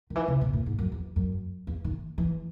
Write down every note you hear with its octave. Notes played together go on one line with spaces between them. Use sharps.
D#3
E3
C#3
B2
A#2
G#2
F#2
E2
F#2
E2
D#3
E3